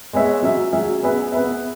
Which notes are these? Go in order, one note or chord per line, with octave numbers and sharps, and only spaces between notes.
G#3 B3 G#4 C#5 E5
F#3 C#4 G#4 E5
F#3 C#4 G#4 E5
B3 G#4 B4 E5
B3 G#4 B4 E5